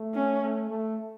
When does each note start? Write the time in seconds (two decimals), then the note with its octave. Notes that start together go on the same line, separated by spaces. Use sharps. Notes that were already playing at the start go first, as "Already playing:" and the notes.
Already playing: A3
0.14 C#4
0.43 A3
0.71 A3